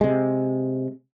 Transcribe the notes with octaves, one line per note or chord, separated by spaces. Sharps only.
C3 G#3